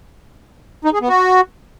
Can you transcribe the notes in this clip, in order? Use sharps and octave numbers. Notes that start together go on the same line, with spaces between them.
D#4
G#4
B3
F#4